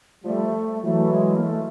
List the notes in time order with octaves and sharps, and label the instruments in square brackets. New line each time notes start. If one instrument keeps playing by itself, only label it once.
[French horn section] F3 G3 [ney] A3
[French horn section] E3 F#3 [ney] A3
[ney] G#3
A#3
A3